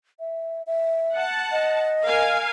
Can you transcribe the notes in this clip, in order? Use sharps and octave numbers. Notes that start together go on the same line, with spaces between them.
E5
E5
F#5 A5
D#5
A#4 F5 G#5